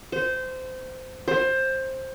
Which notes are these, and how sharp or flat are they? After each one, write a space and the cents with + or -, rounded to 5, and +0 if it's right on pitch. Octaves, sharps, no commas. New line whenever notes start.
C5 -20
C5 +15